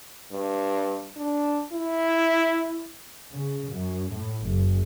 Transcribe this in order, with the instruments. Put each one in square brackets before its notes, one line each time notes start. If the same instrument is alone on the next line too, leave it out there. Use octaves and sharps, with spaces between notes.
[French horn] G2
D4
E4
[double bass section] C#3
F#2
A2
F#1